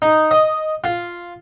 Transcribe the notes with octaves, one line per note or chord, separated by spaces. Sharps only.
D#4
D#5
F4